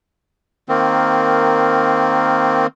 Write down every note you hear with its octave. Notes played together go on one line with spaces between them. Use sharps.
D#3 A#3 C4